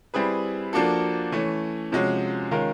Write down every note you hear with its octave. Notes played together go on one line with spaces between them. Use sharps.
G3 C4 E4 G#4 B4
F3 A#3 D4 F#4 A4
E3 A3 C#4
C3 F3 G#3 C#4 F#4
D#3 G#3 C#4 F4 A#4